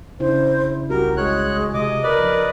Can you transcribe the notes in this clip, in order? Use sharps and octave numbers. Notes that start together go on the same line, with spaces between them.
C#3 D4 E4 C5
C2 F#4 G4 A#4
G#3 C#5 F#6
C3 D#5 D6
A#4 B4 D5 D#5
A#1